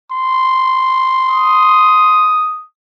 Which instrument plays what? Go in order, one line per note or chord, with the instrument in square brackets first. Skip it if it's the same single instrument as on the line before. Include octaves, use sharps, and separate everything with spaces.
[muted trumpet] C6
[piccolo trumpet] D#6